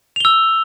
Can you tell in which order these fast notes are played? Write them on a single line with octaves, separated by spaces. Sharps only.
F7 G7 E6